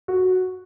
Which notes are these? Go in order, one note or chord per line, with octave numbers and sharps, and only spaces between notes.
F#4